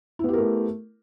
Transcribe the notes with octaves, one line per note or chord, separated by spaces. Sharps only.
A3 B3 E4 G4 A#4